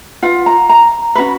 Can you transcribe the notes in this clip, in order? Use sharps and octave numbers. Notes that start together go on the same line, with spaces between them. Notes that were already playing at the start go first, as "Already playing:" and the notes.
F4 B4 F#5
A#5
A#5
C#4 F#4 B4 B5